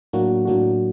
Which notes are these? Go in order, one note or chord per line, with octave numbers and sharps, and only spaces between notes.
A2 F#3 A#3 D4 F#4
A2 F#3 A#3 D4 F#4